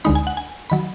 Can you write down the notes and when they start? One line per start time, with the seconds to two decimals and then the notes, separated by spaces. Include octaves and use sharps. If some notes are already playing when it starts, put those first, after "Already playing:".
0.05 D2 D3 G#3 D#4 B5
0.15 G#5
0.27 F#5
0.37 G#5
0.70 D#3 F#3 B5